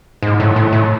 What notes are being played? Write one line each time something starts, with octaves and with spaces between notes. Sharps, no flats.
G#2
A2
A2
A2